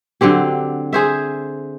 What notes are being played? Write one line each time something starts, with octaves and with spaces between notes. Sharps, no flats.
D3 F#3 C4 G4
G#4 C5 E5